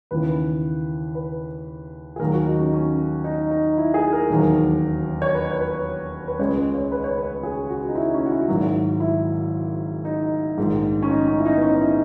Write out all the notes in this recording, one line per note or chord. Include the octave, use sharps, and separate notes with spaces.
D#2 C#3 E3 B4
B4
G#4
D#2 D#3 F#3 A#4
F#4
D#4
C#4
C#4
D#4
D#4
E4
G#4
A#4
E1 D#2 D#3 F#3
C#5
B4
C#5
B4
B4
C#2 C#3 G#3 C#5
B4
C#5
B4
C#5
B4
G#4
F#4
D#4
E4
C#4
F#4
E4
G#1 G#2 D#3 F#3
E4
D#4
A#1 G#2 D#3 G#3
C#4
D#4
C#4
E4
D#4
B3
C#4
D#4
E4